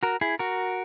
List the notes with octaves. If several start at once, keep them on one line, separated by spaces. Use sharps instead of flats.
F#4 A#4
E4 G#4
F#4 A#4